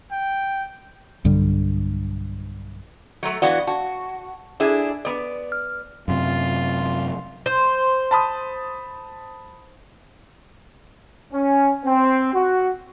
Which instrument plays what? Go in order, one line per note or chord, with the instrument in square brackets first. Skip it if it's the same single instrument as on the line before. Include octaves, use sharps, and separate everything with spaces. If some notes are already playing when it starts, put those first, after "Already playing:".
[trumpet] G5
[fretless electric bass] B1 G2 D3 G3
[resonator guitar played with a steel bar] F#3 A3
[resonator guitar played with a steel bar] E3 B3 F#4 [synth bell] D5 F5
[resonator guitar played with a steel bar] F#4 [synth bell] A5
[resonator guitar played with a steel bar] D4 E4 G#4
B3 D5
[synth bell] F6
[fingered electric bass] F#2 C3 [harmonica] F4
[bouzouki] C5
[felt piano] A5 B5 D#6
[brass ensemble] C#4
C4
F#4